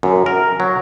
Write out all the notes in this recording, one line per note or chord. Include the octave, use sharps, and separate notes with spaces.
F#2
A#4
F#3